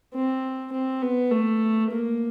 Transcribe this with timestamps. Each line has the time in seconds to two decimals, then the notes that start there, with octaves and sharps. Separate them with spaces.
0.14 C4
0.73 C4
1.02 B3
1.31 A3
1.90 A#3